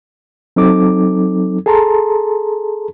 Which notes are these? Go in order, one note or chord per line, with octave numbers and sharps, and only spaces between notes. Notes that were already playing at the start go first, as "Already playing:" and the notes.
F#3 C4 D#4 A4 D6
G#4 A4 A5 A#5 C6